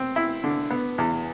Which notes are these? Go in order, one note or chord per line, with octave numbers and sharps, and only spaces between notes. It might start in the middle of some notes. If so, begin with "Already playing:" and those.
Already playing: C4
E4
D3
B3
E2